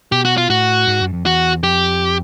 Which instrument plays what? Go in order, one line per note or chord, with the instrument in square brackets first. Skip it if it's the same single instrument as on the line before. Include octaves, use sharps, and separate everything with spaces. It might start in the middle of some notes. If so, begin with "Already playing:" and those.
[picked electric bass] B2 [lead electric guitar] G4
[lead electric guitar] F#4
F4
[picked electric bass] A2 [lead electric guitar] F#4
[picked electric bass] G#2
F#2
F2
[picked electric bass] E2 [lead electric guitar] F#4
[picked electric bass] F2 [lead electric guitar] G4